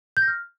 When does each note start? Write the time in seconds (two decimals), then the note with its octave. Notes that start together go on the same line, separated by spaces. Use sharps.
0.17 G6
0.22 A#6
0.28 F6